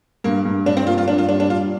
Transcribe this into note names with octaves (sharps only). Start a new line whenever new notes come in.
G2 A#3
G2
G2 D4
C4
A#3 F4
F4
G2 D4
F4
G3 D4
D4
G2 F4